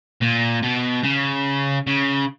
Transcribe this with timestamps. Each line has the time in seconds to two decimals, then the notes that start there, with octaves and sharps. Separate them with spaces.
0.22 A#2
0.63 B2
1.04 C#3
1.87 C#3